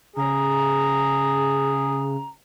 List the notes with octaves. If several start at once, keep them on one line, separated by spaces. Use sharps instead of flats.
C#3 G#4 A#5